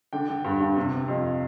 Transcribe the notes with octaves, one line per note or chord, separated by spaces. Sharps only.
D3 G5
D3
G2
G2
C3
C3
F2